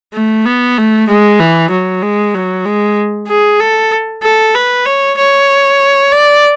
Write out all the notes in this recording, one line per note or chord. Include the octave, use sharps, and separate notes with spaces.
A3
B3
A3
G#3
E3
F#3
G#3
F#3
G#3
G#4
A4
A4
B4
C#5
C#5
D5